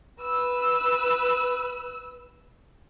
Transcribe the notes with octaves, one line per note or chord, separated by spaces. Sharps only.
B4 E6